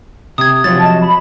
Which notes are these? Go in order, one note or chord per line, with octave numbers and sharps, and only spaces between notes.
C3 D#6 G#6
C3 F3 F#3 A6
D#5 A5
B5